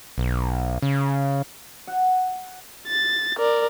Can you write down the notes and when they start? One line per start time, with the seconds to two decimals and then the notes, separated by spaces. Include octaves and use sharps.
0.18 B1
0.82 C#3
1.87 F#5
2.88 A6
3.37 A#4 D5